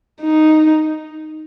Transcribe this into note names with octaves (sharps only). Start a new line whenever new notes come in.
D#4